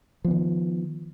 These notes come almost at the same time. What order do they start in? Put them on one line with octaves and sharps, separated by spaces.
F3 B3 D#3